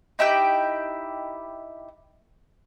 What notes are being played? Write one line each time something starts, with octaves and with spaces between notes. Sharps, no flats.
D#4 E4 G4 G5